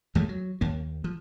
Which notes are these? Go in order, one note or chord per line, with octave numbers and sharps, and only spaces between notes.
D#2 F3 G#3 A3
F#3
D#2 A#3
F3